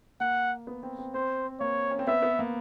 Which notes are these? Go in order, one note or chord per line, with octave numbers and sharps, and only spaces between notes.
A#3 F#5
B3
C4
C4
C4 C5
A#3 C#5
C#4
C4
B3 E5
B3
A#3